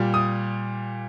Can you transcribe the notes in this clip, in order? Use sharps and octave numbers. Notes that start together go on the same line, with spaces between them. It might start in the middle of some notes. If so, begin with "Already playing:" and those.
Already playing: A#2 G3
D#6